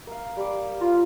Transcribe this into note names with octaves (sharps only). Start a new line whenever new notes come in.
A#3 F5
G3 D6
F4 A#5